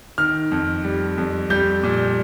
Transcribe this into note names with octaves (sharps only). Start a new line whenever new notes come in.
D#3 F6
F2
G3
F2
G3 G6
A#2